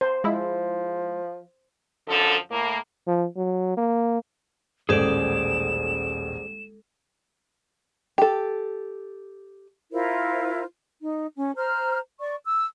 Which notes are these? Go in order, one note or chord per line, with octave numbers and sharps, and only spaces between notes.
C5
F3 G#3 E4
F#2 D3 F3 A4
A2 A#3
F3
F#3
A#3
D#1 A1 G#3 G#4 A4 C5 D5 E7
G4 A4
E4 F4 A#4 C5
D#4
C#4
C5 A#5 F6
D5 C#6
E6